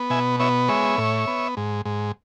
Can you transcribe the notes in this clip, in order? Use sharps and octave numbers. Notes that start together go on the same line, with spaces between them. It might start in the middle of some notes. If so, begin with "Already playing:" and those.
Already playing: B3
B2 E5 G#5
B3 C#5 E5
G#3 C#5 E5
A2
B3
G#2
G#2